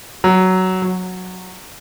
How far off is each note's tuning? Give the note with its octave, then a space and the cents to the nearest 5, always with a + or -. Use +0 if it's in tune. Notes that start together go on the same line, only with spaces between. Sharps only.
F#3 +10
F#3 -10